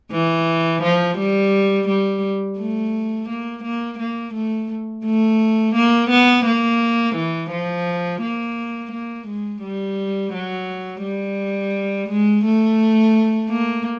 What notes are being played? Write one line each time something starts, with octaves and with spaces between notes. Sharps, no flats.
E3
F3
G3
G3
A3
A#3
A#3
A#3
A3
A3
A#3
B3
A#3
E3
F3
A#3
A#3
G#3
G3
F#3
G3
G#3
A3
A#3